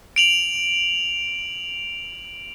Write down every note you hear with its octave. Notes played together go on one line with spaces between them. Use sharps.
D7 F7 F#7